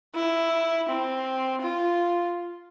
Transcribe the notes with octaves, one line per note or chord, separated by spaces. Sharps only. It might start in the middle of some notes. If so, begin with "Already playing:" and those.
E4
C4
F4